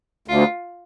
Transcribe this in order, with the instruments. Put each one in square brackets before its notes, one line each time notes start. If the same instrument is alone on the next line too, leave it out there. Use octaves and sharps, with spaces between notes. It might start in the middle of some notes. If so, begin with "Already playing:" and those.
[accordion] D2 [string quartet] F4